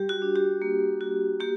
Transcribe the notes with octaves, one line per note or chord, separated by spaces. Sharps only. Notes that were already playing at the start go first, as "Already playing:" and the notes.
Already playing: G3 G4
F#4
D4
G4
A#3
F#4
A#3 G4